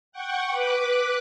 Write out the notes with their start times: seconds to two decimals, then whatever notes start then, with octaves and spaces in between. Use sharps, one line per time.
0.12 F#5 G5 C#6
0.51 B4 D6 F#6